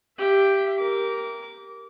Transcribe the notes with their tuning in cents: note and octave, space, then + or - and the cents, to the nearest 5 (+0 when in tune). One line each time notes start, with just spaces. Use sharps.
G4 +0 E5 +30
A#4 +0 D6 -25